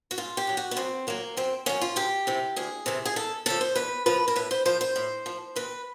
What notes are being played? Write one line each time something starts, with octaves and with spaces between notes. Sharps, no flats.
F#4
G#2 F4
G4
D#3 F#3
F#4
B3
F#2 C4
D#3 F#3 A#3
F#2 C4
D#3 F#3 C#4
F4
D2 G4
C3 E3
D2 G#4
C3 E3
G#4
E2 A4
C#3 F3 A4
C5
E2 B4
C#3 F3 B4
A#4
A2 B4
C5
F3 C5
C5
A2
F3
D#2 B4